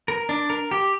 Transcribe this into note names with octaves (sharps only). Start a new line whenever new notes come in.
A#4
D4
A#4
G4